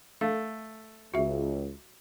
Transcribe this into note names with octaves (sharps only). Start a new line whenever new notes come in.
A3 F5
C#2 F#4 E5